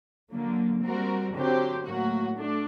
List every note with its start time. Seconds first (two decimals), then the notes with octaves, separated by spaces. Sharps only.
0.32 D3 F#3 A#3
0.84 G3 C4 F#4 A#4
1.34 D3 F#3 C4 G4 C5
1.85 A2 F#3 A#3 F#4
2.37 A3 D4